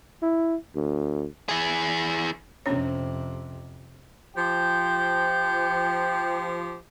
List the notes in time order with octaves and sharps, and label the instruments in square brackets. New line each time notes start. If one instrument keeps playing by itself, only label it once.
[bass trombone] E4
D2
[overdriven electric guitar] E3 G#4
[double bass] F2 C3 [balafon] C#4 D4 C#5
[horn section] F3 G4 [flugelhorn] G5 [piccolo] G6